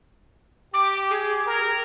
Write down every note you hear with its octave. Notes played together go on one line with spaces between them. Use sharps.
G4 D6
G#4
A#4